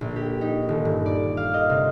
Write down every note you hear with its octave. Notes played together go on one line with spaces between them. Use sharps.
A#1
G4
D#4
D#1
G2
D5
F5
D#5
C3